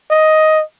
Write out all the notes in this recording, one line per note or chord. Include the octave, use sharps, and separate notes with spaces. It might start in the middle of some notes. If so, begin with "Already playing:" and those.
D#5